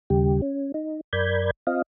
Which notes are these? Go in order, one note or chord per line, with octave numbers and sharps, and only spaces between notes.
D#2 C#3 G3 G4
C#4
D#4
F#2 A#4 D5 B5 G6 G#6
C4 F4 D#5 F5